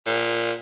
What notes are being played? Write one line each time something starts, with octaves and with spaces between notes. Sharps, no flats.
A#2